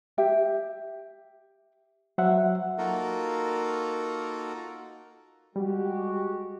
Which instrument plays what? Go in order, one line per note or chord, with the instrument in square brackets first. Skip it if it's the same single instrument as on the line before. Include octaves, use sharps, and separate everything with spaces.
[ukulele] G4 E5 G5
[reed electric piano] F#3 E5 F#5 [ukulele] C5
[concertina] A#3 D#4 F4 F#4 A4 A#4
[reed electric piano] G3 [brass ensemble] G#3 F#4 G4